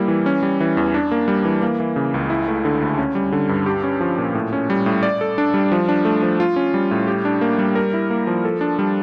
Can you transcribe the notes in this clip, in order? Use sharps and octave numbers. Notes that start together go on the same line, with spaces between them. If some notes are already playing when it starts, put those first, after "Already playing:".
Already playing: G3 A#3 E4
E3
C#4
G3
E3
E2
D4
A#3
G3
E3
A#3
E3
C#3
C#2
E4
A3
D3
D2
C#4
G3
D3
G2
G4
C#4
F3
A#2
A2
C#4
G3
A2
D5
A4
D4
G3
F3
D4
A3
F3
F4
C#4
G3
A2
G4
D4
A#3
G3
A#4
E4
A#3
F3
A4
D4
G3